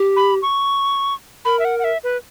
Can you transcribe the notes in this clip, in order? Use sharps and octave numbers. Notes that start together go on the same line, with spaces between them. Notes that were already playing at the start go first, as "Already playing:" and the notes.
Already playing: G4
B5
C#6
A#4 B5
E5
F#5
F#5
E5
B4